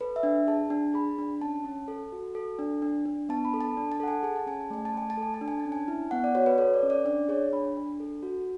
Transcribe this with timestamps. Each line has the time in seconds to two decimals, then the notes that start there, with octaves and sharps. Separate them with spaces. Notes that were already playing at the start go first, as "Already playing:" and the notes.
0.01 A4 B4
0.16 E5
0.23 D4
0.47 G#4 A5
0.70 D4
0.94 G#4 B5
1.19 D4
1.41 C#4 A5
1.64 C#4 A5
1.88 A4
2.12 F#4
2.35 A4
2.59 D4
2.82 D4
3.06 D4
3.29 B3 A5
3.45 B5
3.54 A4
3.61 A5
3.77 D4
3.92 A5
4.00 A4 F#5
4.08 G#5
4.23 G#4 G#5
4.36 A5
4.46 C#4 G#5
4.61 A5
4.70 A3 G#5
4.85 A5
4.94 A3 G#5
5.10 A5
5.17 A4 G#5
5.34 A5
5.41 D4
5.48 G#5
5.60 A5
5.65 C#4
5.72 G#5
5.88 E4
6.11 B3 F#5
6.24 D5
6.35 F#4 C#5
6.46 B4
6.58 A4 C#5
6.74 D5
6.83 C#4
6.90 D5
7.05 D4 D5
7.29 G#4 C#5
7.53 D4 B5
7.77 D4
8.00 A4
8.23 F#4